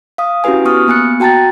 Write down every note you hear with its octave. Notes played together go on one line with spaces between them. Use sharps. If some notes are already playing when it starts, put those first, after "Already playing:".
F5 D#6
C#4 E4 F#4 G4 B4 G#5
B3 C#6 D#6 F6
A#3 B3 G#5 F#6 C#7
F#4 G5 A5 A#5 A6